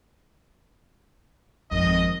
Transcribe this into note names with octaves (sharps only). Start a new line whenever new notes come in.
G#1 F2 D#3 D#5